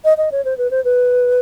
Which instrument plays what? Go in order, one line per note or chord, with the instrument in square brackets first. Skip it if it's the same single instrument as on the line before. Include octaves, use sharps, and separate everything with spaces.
[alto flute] D#5
D#5
C#5
C5
B4
C5
B4